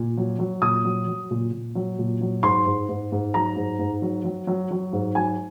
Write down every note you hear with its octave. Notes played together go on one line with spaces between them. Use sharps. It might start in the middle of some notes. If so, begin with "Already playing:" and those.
Already playing: A#2
F#3
F#3
A#2 D#6
F#3
F#3
A#2
A#2
F#3
A#2
F#3
G#2 C6
G#2
G#2
G#2
F#3 A#5
G#2
G#2
F#3
F#3
F#3
F#3
G#2
F#3 G#5